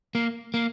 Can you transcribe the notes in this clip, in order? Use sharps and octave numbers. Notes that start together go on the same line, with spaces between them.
A#3
A#3